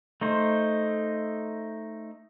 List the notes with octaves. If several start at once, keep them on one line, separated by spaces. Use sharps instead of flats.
A3 D#4 C5